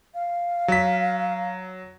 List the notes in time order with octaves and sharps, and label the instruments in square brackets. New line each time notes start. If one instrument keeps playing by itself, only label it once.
[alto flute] F5
[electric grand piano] F#3 B6